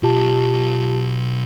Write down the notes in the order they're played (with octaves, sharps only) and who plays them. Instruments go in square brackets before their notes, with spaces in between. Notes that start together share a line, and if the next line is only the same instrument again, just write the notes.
[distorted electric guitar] B1 [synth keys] F4 G4 A5